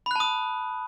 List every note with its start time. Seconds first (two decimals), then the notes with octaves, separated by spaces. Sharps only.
0.06 B5
0.11 F#6
0.16 A5
0.20 D#6